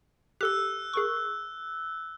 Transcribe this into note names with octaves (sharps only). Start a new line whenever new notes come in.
G4 A4 E6 F#6
G#4 A#4 C#6